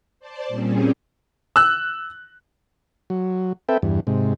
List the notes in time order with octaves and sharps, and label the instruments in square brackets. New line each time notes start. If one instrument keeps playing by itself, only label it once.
[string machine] C5 D5 A5
A#2 G3 C4 C#4 G#4
[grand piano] E6 F#6
[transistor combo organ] F#3
C4 A4 B4 E5 G5
E2 G2
G#2 C3